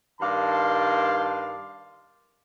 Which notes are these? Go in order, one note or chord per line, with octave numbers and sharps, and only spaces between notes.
G2 D#3 D5 F5 A5 C6